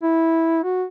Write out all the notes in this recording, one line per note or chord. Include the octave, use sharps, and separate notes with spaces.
E4
F#4